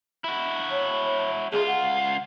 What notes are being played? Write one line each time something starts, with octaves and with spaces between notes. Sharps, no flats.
E4 F#4
C#5
C#2 F4 G#4
F#5